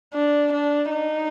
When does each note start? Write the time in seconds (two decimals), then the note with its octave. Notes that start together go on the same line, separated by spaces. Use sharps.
0.14 D4
0.53 D4
0.91 D#4